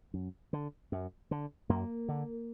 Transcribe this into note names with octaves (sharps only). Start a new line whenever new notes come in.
F#2
D3
F#2
D3
F#2 A#3
D3